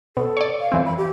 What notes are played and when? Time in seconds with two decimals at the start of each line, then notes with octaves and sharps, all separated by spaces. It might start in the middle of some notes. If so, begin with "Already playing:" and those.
0.17 B2 A4
0.37 C#5 D5
0.61 F5
0.72 F2 E3 C4
0.85 B5
0.98 G4